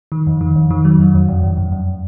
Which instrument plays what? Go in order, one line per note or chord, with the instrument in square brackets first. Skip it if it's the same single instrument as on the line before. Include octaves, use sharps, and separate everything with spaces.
[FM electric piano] D#3
F2
D#3
F2
D#3
F#3
F2
F2
F#2
F#2
F#2
F#2